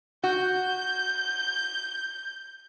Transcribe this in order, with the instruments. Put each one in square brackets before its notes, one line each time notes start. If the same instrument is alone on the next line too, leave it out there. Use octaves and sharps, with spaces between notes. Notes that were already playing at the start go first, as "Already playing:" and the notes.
[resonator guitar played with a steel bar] F#4 [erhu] G6